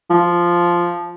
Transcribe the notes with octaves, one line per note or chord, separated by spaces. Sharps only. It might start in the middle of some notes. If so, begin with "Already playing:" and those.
F3